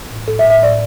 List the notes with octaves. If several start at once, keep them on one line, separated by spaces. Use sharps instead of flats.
A2
A2 A4
E5
A2
E5
A2 D5